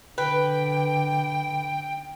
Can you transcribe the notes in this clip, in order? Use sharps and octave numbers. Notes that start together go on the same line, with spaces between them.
D3 B4 G5